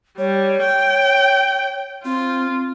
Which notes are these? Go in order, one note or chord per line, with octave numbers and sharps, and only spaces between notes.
G3 C#5
G5
C4 F4